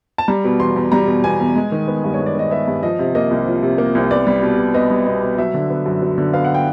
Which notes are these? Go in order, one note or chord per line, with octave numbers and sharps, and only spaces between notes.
A5
G3 A#5
B2
E2 C6
E2
G3 A#5
B2
E2 G#5
E2
G#3
D#3
B3
G2
C#5
G#3
D5
D#3 D#5
B3 E5
G2
F3 D#5
C3
A#3 D#5
C2
F3
C3
A#3
C2
B3 D5
G3
B2
B2
B3 D#5
G3
B2 D#5
B2
F#3 E5
D3
B3
F#2
F#3
D3
B3 F5
F#5
G5